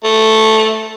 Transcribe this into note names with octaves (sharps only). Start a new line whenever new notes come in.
A3